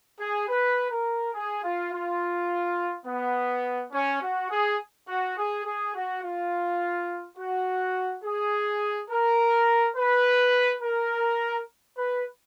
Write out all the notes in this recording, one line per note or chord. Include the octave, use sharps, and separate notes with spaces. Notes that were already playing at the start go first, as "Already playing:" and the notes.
G#4
B4
A#4
G#4
F4
F4
B3
C#4
F#4
G#4
F#4
G#4
G#4
F#4
F4
F#4
G#4
A#4
B4
A#4
B4